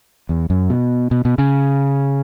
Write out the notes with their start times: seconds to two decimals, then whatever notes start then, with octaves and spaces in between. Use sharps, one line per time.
0.29 E2
0.50 F#2
0.70 B2
1.11 B2
1.25 B2
1.38 C#3